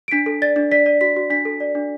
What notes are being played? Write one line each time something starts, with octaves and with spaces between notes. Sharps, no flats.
D7
D4 B6
A4
D5 A6
D4
D5 B6
D5
F#4 B6
F#4
D4 B6
A4
D5
D4